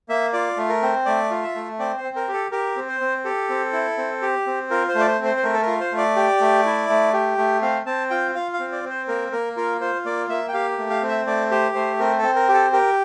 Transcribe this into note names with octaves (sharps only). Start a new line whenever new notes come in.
A#3 E5
F4 D5
A3
A#4
C4
A3 D5
F4
E5
A3
C4 D5
C5
C4
A#4
G4
A4
G4 A#4
C4
C5
C4
G4 A4
C4
E4
C4
G4
C4
F4 A#4
C5
A3
D5
C5
C4
C5
C5
A3 A#4
A4
A#4
F4
C5
A3
D5
G4
A3
E4
A3
G4
A3
C4 F5
C4 A5
F4 G5
F4 F5
F5
C4
D5
C4
C5
A#3 A#4
A#3 A#4
F4 A#4
F4 C5
A#3 D5
A#3 E5
G5
G4 F5
A3
F5
C4
E5
A3 D5
G4 C5
A3 C5
C4 A#4
A4
C4
A#4
G4
A4
G4 A#4